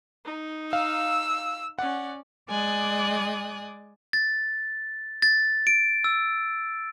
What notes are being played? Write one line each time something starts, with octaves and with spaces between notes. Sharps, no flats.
D#4
F5 E6
C#4 D5 F#5
G#3 D5 G#5 D#6 F#6
A6
A6
D7
E6